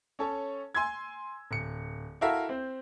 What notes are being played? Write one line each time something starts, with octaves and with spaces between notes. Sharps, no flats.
C#4 A4 C#5
G#5 C6 E6 G#6
D1 C#7
E4 F#4 A4 A#4 E5 F5
C4 C5